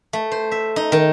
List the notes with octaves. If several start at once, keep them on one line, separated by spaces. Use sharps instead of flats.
A3
C5
E5
D#4
D#3